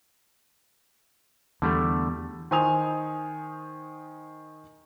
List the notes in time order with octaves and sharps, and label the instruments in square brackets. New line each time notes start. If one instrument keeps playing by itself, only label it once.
[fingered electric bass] E2 [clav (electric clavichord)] D3 G3 A3
[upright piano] D#3 C5 G#5 D#6 F7